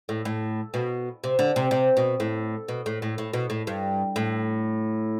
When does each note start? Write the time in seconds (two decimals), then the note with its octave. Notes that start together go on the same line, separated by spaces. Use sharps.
0.09 A2
0.25 A2
0.74 B2
1.24 C3
1.39 D3
1.56 C3
1.71 C3
1.97 B2
2.20 A2
2.69 B2
2.86 A2
3.02 A2
3.18 A2
3.33 B2
3.50 A2
3.67 G2
4.16 A2